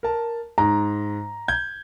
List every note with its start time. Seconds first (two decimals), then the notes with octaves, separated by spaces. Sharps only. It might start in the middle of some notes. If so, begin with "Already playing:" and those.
0.03 A#4 A5
0.58 G#2 A#5
1.48 G6 G#6